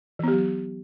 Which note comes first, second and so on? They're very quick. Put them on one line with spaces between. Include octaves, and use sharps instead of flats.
E3 B3 G4 F#3